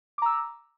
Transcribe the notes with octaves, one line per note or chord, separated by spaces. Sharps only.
A#5 D6 E6